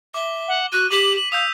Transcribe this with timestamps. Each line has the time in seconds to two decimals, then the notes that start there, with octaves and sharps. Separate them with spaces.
0.14 E5 D6 G7
0.48 F#5
0.72 F#4 F#6 D#7
0.90 G4 D6 B6 F#7
1.16 F#7
1.32 F5 D#6 E6 G6 F7